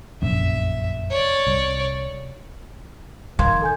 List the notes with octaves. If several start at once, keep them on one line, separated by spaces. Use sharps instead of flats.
F1 A#1 F#2 E5
C#5 D5
C2
D#3 F5 C6 G#6
A4 G#5 G6